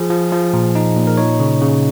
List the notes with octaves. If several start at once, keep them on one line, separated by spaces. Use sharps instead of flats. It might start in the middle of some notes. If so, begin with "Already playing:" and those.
Already playing: F3 G#4
F3
F3
A#2
D#4
A#2
A#4
D#4 C#5
C#3
C#3